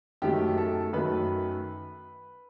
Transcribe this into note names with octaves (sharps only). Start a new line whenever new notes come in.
F#2 D#3 A3 G4
A4
F#2 D#3 A3 B4